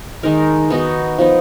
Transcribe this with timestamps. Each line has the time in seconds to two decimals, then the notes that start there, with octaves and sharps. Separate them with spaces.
0.23 D#3 G#3 D#4 A#4
0.70 B3 D#4 F#4
1.18 F3 B3 D#4